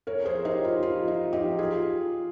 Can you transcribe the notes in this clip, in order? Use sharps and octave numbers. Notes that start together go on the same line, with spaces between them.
A#4 C#5
G#4 C5
D#4 G4
F4
F4
D#4
D#4 G4
F4 G#4